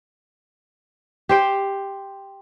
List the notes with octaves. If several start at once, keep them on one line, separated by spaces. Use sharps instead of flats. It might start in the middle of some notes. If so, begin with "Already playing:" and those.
G4 C5 G5